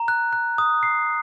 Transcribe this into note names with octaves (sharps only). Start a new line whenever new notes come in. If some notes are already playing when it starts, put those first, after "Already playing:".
Already playing: A#5
F#6
F#6
D#6
C7